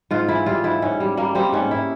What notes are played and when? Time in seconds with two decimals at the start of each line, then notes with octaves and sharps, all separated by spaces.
0.11 G#2 F4
0.28 E3 E4
0.46 G3 F4
0.64 G#2 E4
0.82 G#2 C#4
1.00 G3
1.17 G3 A#3
1.35 G3 C4
1.52 G#2 C#4
1.71 E4